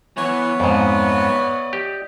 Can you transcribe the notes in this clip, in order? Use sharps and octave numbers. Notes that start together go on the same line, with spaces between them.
E3 B3 C#5
F2 G#2 D5 D#5
G4